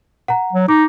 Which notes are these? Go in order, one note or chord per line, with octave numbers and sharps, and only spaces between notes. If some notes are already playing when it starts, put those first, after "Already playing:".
F#5 A#5
F#3
D#4 D6